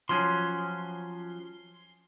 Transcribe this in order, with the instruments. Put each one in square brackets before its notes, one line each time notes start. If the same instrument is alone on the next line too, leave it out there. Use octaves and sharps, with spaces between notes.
[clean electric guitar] F3 F#3 C#4 [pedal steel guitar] C6